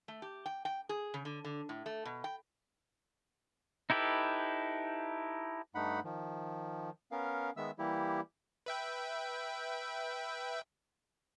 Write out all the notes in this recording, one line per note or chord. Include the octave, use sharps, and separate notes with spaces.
A3
G4
G5
G5
G#4
C#3
D3
D3
A2
A3
B2
G5
D#4 E4 G4 A4 B4
G2 A3 D#4 F#5 B5
D#3 F3
B3 C#4 A#4 F5
D#3 G#3 B3 E5 E6
E3 G3 A#3 E4 G4
B4 E5 G5